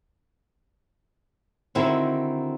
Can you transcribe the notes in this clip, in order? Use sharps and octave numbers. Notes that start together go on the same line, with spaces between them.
D3 D#3 C4 D#4 E4 F#4